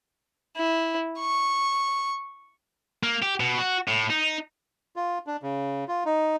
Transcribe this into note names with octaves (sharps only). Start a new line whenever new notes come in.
E4
C#6
A#3
G4
B2
F#4
A2
D#4
F4
D4
C#3
F4
D#4